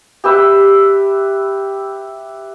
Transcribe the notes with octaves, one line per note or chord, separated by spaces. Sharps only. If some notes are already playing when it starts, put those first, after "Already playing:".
G4 B4 E5